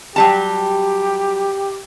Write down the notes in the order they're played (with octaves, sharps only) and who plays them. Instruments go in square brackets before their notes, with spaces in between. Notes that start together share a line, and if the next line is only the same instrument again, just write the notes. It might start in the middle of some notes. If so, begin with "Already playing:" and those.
[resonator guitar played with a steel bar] F#3 G3 A5 [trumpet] G4